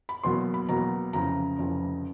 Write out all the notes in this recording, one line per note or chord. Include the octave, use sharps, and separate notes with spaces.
B5
E2 B2 F#3 A#3 C6
B5
E2 B2 F#3 A#3 A#5
F1 F2 C#3 E3 A#5
F1 F2 C#3 E3